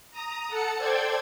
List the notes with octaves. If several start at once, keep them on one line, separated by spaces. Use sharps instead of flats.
A#5 D#6
A4 F#5 A5 C#7
A4 C5 D5 G5 G#6